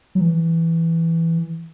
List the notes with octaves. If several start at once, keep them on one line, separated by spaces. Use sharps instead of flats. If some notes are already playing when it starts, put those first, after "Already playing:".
F#3
E3